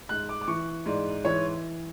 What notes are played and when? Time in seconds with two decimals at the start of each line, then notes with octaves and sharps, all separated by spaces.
0.09 G#2 F#6
0.29 D6
0.41 D6
0.47 E3 C#6
0.86 G#2 D5
1.25 E3 C#5